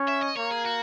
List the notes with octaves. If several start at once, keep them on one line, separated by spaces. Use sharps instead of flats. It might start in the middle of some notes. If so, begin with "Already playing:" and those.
Already playing: C#4
E5
D#5
A#3 C#5
G#4
F#4